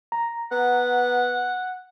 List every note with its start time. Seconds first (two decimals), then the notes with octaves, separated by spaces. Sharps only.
0.12 A#5
0.52 B3 F#5